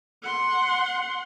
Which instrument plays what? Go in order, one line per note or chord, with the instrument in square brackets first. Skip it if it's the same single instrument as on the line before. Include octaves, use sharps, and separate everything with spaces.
[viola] F#5 C6